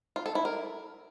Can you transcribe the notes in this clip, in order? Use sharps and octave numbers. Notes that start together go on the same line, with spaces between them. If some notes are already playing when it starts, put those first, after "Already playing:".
F4
A4
E4
A#4